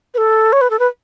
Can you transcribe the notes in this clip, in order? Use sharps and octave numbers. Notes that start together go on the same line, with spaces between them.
B4
A4
C#5
B4
A4
B4